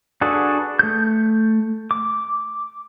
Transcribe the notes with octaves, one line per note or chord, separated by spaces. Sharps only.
D4 F#4 G#4 A4 B4
A3 G6
D6